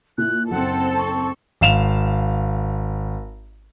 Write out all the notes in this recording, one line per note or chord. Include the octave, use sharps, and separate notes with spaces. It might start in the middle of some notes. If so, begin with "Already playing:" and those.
A#2 E4 F#6
F#1 C4 A4 F#5
C#6
G#1 F5 E7 F7